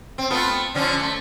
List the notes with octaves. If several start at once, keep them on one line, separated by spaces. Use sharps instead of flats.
C4
A3 B3 F4
D3 F3 C#4
A3